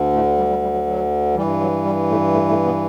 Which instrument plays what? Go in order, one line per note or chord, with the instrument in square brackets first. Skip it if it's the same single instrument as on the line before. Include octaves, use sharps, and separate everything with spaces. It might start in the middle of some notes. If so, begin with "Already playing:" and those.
Already playing: [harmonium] D2 D3
A2 A3
G3
G3
G3
F#3
F#3
G2 E3 G3
F#3
G3
A2 A3
A2 A3
A2 A3
B2 B3